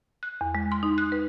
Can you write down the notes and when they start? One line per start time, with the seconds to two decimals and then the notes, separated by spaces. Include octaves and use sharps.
0.23 F#6
0.41 E2
0.55 G#3
0.72 C6
0.83 D#4
0.98 F#6
1.12 B4